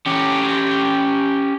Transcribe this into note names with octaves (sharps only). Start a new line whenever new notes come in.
C#4 G4